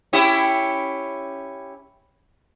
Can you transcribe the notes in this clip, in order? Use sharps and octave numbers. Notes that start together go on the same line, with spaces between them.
C#4 E4 G4